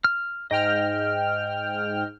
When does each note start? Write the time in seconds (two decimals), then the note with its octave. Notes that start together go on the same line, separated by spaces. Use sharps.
0.04 F6
0.51 G#2 D#5 G5 F6